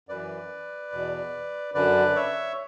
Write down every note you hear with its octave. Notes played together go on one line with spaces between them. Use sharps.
F#2 E3 B4 D5
E2 B2
F#2 D3 B4 D5
C#5 E5